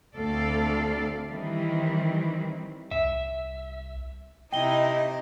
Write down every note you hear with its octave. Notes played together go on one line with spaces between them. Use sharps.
D2 A3 C4 A4 D5 F5
D#3 E3 G3 C4
C2 E5
C3 D#4 E4 D#5 G5 G7